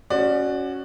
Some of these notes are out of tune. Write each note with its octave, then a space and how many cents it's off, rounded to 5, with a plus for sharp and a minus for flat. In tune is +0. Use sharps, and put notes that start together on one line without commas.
C#4 +0 F#4 +0 D5 +25